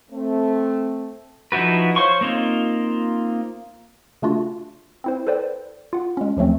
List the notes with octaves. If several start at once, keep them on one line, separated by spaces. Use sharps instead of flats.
A3 C4
F3 D#4 E4 F#4 B4
C5 C#5 F5 C6 C#6
A#3 C4 D#4 F4
C#3 A3 D4 F4 F#4
C4 E4 C5
A4 B4 C5 D5 G5
F4 F#5
G#3 C#4
D#2 F3 F#3 A3 C4